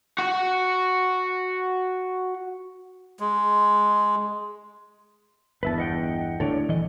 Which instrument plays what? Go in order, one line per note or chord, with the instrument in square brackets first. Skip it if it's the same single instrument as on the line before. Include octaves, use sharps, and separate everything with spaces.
[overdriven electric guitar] F#4 F#5
[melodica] G#3
[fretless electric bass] G1 E2 [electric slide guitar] B4 E5 A5
[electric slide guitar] D#5 F#5 G5
[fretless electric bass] D2 A2 D3 [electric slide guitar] A4 C#5 D5
[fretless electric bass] A#1 [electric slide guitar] E3 D#5